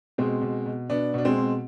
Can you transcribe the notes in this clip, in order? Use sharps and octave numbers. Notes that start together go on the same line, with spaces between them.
B2 G#3 C4
B2
B2
B2 B3 D4
B2 D4
G#3 C4
B2